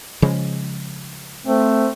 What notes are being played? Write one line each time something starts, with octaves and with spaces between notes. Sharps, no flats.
C#3 F3 G#3
A3 C4